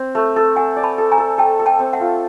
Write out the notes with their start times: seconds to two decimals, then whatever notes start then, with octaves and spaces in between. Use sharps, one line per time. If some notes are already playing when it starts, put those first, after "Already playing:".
Already playing: C4
0.15 A3
0.36 A4
0.56 A4 F#5 G#5
0.76 D5
0.83 A5 B5
0.98 A4
1.12 G#5 A#5
1.18 A4
1.38 A4 G5 A5
1.59 A4
1.66 G5 A5
1.79 C4
1.93 E5 F#5
2.00 F4